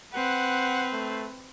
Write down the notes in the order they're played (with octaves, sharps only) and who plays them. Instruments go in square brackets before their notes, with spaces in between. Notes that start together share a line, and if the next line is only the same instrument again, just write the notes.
[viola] C4 B4 [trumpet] F#5
[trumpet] A3